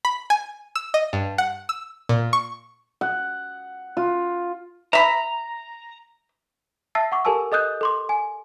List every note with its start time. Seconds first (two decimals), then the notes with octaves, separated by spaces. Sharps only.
0.05 B5
0.30 G#5
0.75 E6
0.94 D#5
1.13 G2
1.38 F#5
1.69 E6
2.09 A#2
2.33 C#6
3.01 F#5
3.97 F4
4.93 E5 A#5 B5
6.95 E5 A5 E6 A6 C7
7.12 F#5 C#6 D6
7.25 G4 A4 A#4 G#5 A5 E6
7.52 A4 D#5 D#6 F#6 G6
7.81 A4 C6 D6
8.09 G#5